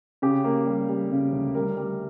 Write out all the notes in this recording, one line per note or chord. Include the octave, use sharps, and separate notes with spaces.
C#3 G4
A#3
G3
G3
C#3
D2
G3 A#4
G3